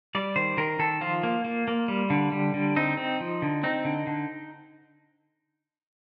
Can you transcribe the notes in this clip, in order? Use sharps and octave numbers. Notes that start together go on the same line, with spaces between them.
G3 D5
D#3 C5
D#3 A#4
D#3 A4
F3 F4
A#3
A#3
A#3
G3
D3
G3
D3
C4 D#4
C4
F3
D3
C4 D#4
D3
D3